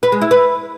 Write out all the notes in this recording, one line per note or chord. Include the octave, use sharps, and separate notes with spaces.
B4
G#3
E4
B4